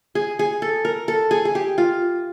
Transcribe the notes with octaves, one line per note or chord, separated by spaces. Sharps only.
G#4
G#4
A4
A#4
A4
G#4
G#4
G4
F4